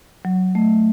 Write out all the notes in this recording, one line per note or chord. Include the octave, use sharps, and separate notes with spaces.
F#3
A3